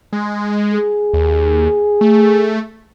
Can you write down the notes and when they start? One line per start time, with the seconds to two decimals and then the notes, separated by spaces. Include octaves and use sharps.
0.13 G#3
0.74 G#4
1.13 D#2
2.01 A3